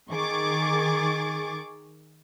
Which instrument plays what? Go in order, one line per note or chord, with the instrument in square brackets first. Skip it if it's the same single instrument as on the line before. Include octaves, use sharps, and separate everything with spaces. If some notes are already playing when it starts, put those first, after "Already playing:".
[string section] D#3 G#4 C#6 D6 A6